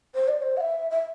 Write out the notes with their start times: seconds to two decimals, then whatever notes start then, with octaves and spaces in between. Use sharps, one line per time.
0.15 C5
0.28 D5
0.42 C5
0.57 F#5
0.60 E5
0.91 E5